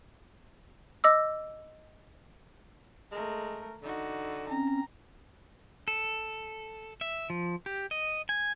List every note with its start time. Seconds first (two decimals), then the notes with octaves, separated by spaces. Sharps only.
1.04 D#5 D6 E6
3.12 G#3 A3 A#4
3.83 D3 D#4 F#4
4.49 C4 C#4 A#5
5.88 A4
7.01 E5
7.30 F3
7.66 G4
7.91 D#5
8.29 G#5